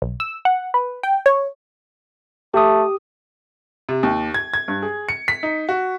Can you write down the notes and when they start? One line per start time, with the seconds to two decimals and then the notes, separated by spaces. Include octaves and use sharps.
0.02 B1
0.20 E6
0.45 F#5
0.74 B4
1.03 G5
1.26 C#5
2.54 A3 G4 D#6
3.89 C3
4.03 D#2
4.34 G#6
4.54 G#6
4.68 G2
4.82 G#4
5.09 C#7
5.28 B6
5.43 D#4
5.69 F#4